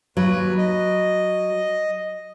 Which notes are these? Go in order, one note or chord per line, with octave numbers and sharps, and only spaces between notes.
D#2 F#3 B4
D#5